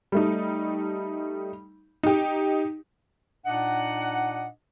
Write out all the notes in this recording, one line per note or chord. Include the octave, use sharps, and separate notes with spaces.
G3 A3 D#4
D#4 G4
A#2 D4 D#4 D#5 F#5